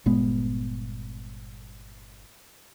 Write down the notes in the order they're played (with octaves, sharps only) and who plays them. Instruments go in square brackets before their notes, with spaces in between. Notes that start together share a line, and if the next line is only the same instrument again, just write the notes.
[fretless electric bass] G1 A#2 G#3 B3